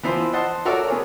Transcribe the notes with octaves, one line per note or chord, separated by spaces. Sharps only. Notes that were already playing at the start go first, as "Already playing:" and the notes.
E3 F3 B3 E4 C5
C5 D#5 F#5 A5 C6
F#4 A4 A#4 C#5 D5 E5
B3 G#4 C#5